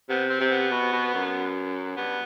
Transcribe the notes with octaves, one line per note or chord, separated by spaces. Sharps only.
C3 B3
C4
C3
B3
B2
B2
F#2
G2 B3